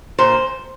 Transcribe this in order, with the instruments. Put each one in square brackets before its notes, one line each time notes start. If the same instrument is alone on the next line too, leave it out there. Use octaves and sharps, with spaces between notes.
[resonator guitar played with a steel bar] A#2 C5